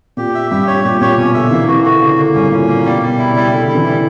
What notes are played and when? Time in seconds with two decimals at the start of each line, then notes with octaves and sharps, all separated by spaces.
0.17 A#2 G4
0.35 E5
0.51 G2 G4
0.67 C#5
0.84 A#2 G4
1.01 A#2 C#5
1.17 B2 C#4
1.34 D3 E5
1.51 E3 A#3
1.68 E3 F#4
1.84 D3 F#4
2.01 C#3 A#3
2.18 D3 A#3
2.35 G2 C#4
2.51 A#2 C#4
2.68 A#2 A#3
2.85 B2 G3
3.02 G3
3.07 B2
3.18 E4
3.30 C#3
3.36 G3
3.52 D3 E4
3.68 E4
3.75 E3
3.86 G3